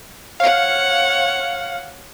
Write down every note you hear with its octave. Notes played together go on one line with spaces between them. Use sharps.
C#5 F5 F#5